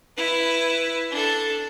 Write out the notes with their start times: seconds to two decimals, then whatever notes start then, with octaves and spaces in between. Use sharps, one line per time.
0.17 E4 B4
1.11 D4 A4